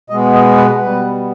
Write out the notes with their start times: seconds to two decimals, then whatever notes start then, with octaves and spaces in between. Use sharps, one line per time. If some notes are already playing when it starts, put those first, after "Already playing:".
0.10 B2 G#3 B3 D#5
0.34 D#5
0.57 B4
0.81 B2 G3 B3 B4